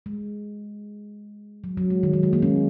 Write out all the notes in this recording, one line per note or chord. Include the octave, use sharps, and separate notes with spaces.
G#3
F#3
F#3
G#3
D#3
F#3
G#3
F#3 A#3
G#3 C#4